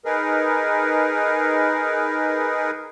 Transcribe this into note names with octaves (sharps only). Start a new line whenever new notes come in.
D#4 G#4 A#4 B4